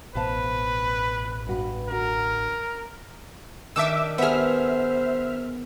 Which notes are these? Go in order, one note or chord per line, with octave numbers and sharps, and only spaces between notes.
A1 B2 B4 C5 F5 A5
G2 F#4 B4
D3 F#4 A#4
D#3 D4 E5 D6 E6
B3 G#4 C5 E5 F6